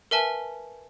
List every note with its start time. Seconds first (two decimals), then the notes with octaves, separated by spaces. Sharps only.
0.11 A#4 B4 E5 G#5 A5